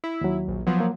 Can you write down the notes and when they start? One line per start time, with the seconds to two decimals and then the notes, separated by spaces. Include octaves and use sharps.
0.04 E4
0.21 D#2 F#3
0.48 A#1
0.67 F3 F#3 B3
0.80 A#3